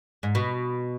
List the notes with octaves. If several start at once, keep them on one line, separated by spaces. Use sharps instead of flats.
G#2
B2